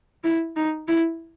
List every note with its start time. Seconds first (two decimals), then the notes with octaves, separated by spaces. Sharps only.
0.24 E4
0.56 D#4
0.88 E4